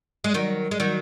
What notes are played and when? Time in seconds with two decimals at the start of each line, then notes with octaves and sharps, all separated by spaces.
0.24 G#3
0.34 D#3 F#3
0.71 G#3
0.80 D#3 F#3